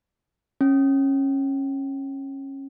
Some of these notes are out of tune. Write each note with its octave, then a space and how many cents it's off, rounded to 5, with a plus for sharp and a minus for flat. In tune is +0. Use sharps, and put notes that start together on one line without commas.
C#4 -25